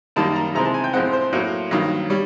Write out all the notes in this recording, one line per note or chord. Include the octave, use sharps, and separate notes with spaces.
F#2 D#3 G3 A#3 A5
A#5
C3 E3 G#3 C4 A#5
A5
G#5
G5
A2 F3 G#3 C4 F#5
C5
A2 F#3 A#3
G2 D#3 F#3 A#3
G3 C#5